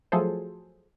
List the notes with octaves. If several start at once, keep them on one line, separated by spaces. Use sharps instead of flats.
F3 F#3 A3 G#4 A4 C5